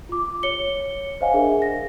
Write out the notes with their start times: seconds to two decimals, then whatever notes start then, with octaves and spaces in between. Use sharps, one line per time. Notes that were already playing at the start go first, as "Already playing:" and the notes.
0.09 F4 D6
0.43 C#5 C#7 G7
1.21 C5 C#5 D#5 F5 F#5 G#5
1.34 D4 G#4 A#4 E5
1.62 A#6